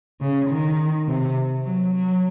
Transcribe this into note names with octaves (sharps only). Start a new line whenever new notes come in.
C#3
D#3
C3
F#3
F#3